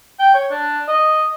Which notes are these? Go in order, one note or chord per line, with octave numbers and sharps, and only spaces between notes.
G5
C#5
D4
D#5